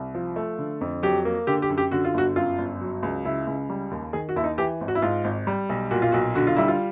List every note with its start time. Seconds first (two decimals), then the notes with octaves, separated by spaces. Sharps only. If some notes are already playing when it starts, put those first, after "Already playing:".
Already playing: C2
0.15 F3
0.36 A3
0.59 D3
0.81 F2
1.03 F#3 G4
1.25 A#3
1.47 D3 G4
1.62 G4
1.70 F#2
1.78 G4
1.91 D3 F#4
2.05 F4
2.14 G1 F#4
2.36 F#2 F4
2.58 G1
2.81 F#3
3.03 C#2
3.25 C#3 E4
3.47 C#2
3.70 G3
3.91 D#2
4.13 D#3 G#4
4.29 F#4
4.36 D#2 E4
4.44 D#4
4.58 E3 G4
4.81 G#1
4.88 F#4
4.95 E4
5.02 G#2 F4
5.24 G#1
5.47 G3
5.69 B1
5.91 A#2 F#4
6.02 F4
6.12 B1 F#4
6.35 D3 F#4
6.47 F4
6.57 G3 E4
6.68 F4